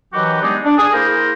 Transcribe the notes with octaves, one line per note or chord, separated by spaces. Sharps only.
D#3 E3 F#3 F#4 G4 B4
G3 G#3 B3 D4 D#4 G#4
D4
G#4
A#3 E4 G#4 A#4 C5